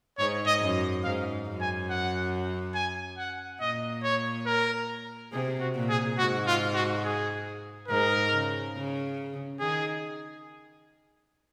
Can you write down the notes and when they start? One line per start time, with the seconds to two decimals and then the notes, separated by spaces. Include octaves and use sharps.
0.18 G#2 C#5
0.47 D#5
0.60 F#2
1.04 G#2 F5
1.47 F#2
1.61 G#5
1.90 F#5
2.75 G#5
3.18 F#5
3.61 A#2 D#5
4.03 C#5
4.46 A#4
5.32 C3 G#4
5.60 F#4
5.75 A#2
5.89 G#4
6.18 G#2 F#4
6.47 F4
6.75 F#4
7.04 G#4
7.89 G#2 A#4
8.32 C#3
8.76 C#3
9.60 D#3 G#4